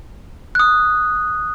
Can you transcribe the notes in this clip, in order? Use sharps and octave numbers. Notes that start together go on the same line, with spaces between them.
D#6 F#6